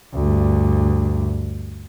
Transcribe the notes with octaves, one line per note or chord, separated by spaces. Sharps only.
D2 G2